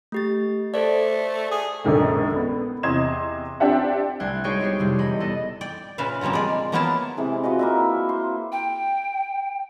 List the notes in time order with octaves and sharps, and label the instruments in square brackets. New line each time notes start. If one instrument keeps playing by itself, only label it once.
[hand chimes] A3 G4 A6
[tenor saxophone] A3 [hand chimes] A4 C5 D5
[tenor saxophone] G#4
[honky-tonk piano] A#1 F#2 D3 D#3 G#3
B3
E2 C3 D#5 C6 G#6 E7
C4 D4 G4 E5 F#5
[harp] C2 A3 D4 C5 F#6 G#6
G#3 D#4 F#4 G#4 C#5 G5
B3 E4 F#4 G4 C5
F2 C3 G3
E1 D#5 B5
B3 A4 D#5
[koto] D5 G5
A#2 C#3 B4 E5 F5
D3 F3 G3 A#3 C4
G#3 D5
F3 F#3 A#3 B3 E4 A5
[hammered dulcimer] C3 E3 G#3
F4 F#4 B4 D#5
A#3 E4 E5
C5
[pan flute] G5